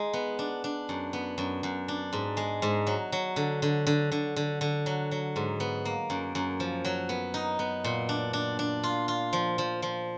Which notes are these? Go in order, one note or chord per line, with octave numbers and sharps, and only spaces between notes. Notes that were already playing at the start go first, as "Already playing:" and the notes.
Already playing: G#3 D#4
B3
D4
D4
F#2
B3
F#2
F#2
D4
G#2
G#3
G#2
F#3
F#3
D3
D3
D3
D3
D3
D3
F#3
F#3
G#2
B3
A#3
F#2
F#2
F3
F#3
B3
D#4
B3
A#2
D4
D4
D4
F4
F4
F3
F3
F3